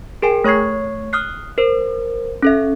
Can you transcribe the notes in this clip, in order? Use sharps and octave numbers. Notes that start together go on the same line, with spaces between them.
G#4 A#4 G5 G#5
A3 C#5 C#6 G#6 C7
D#6 F6 F#6 C7
A#4 C5
C#4 A4 E5